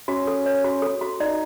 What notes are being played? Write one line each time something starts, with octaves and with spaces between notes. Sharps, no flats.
C#4 F#4
A4
C#5
F#4
A4
F#4
D#4 D5